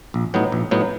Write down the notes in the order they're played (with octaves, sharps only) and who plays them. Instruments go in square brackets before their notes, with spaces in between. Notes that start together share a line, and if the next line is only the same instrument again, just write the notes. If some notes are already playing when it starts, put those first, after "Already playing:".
[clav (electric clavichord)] A#1
A2 F#3 B3 D#4
A#1
A2 F#3 B3 D#4